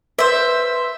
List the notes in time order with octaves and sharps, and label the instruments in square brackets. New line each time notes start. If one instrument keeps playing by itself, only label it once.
[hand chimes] B4 [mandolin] C5 E5